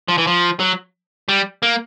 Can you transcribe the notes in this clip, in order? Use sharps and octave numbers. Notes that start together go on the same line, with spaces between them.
F3
E3
F3
F#3
G3
A#3